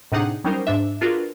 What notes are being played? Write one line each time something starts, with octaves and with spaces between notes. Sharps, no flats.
A2 C3 D4 D#4 G#4 F#5
F#3 G3 C#4 D#4 A#4 C5
G#2 D4 E5
D4 F4 F#4 G#4 A#4 B4